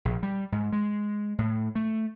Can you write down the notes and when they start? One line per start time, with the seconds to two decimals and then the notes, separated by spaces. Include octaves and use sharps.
0.05 A#1
0.23 G3
0.52 G#2
0.72 G#3
1.38 A2
1.75 A3